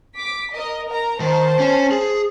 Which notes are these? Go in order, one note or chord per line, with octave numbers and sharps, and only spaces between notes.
D6 B6
A#4 D#5
A#4 A#5
D#3 C5 A5
C#4 G#5
G#4